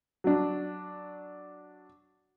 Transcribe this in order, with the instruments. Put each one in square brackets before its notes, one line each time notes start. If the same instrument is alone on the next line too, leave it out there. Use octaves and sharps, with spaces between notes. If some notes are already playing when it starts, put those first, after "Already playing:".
[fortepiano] F#3 D4